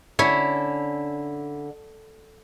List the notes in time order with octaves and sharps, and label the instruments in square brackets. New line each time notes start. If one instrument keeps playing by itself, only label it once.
[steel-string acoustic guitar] D3 [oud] C#4 [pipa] E4